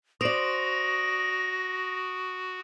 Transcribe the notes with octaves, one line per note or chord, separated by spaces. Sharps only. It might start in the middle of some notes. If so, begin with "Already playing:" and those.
F#4 C5 D5 D#6 A#6 D7 F#7